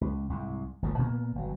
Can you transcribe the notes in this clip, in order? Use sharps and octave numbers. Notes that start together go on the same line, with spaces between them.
C#2
C2 G#2
G1 F3 A3
A#2 A#3 B3
G1 F#3